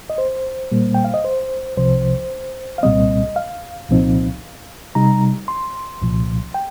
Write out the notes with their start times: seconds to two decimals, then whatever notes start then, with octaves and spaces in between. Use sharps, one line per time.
0.10 D#5
0.18 C5
0.72 A#2 G3 A#3
0.95 G5
1.04 F5
1.14 D#5
1.25 C5
1.77 C2 C3 F3 C5
2.78 F5
2.83 C2 A#2 G3 C4 D#5
3.36 F5
3.89 C2 A#2 F3 C4 D#4
4.95 C3 G3 D#4 A#5
5.48 C6
6.01 C2 A#2 F3
6.54 G5